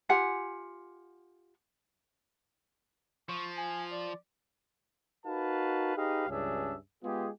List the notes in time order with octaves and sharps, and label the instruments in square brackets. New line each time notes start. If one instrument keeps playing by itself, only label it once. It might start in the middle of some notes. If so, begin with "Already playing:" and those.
[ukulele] F4 G4 F#5 G#5
[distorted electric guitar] F3 [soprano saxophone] C#6
[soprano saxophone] G#5
D5
[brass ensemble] D#4 F#4 A#4 B4 F5 A5
D#4 G4 G#4 B4 D#5 F5
C#2 G2 C#4 D4 G#4 E5
G#3 B3 F4 G4 G#4